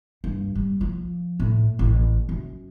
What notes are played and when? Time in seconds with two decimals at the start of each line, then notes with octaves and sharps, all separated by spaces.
0.24 G2
0.55 G3
0.81 F3
1.40 A2
1.79 A1
2.29 F#2